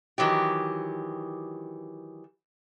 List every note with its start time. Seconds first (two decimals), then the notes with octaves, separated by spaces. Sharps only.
0.18 D#3 E3 F#3 G4